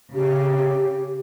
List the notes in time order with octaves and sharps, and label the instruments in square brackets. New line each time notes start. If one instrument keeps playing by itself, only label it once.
[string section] C#3 [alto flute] G4